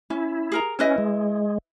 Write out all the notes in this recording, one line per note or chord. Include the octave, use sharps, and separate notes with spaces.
C#4 E4
G#4 A#4 A#5
C#4 E4 B4 D#5
G#3